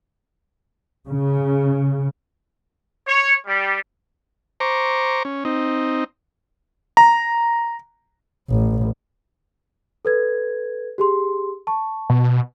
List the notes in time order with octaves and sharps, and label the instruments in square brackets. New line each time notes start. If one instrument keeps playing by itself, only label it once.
[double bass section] C#3
[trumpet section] C#5
G3
[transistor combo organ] C5 A#5 C#6 D6
C#4
C4 D#4
[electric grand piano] A#5
[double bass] A1
[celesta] A4 B4 G#6
G4 G#4 C6
A5 C#6
[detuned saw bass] B2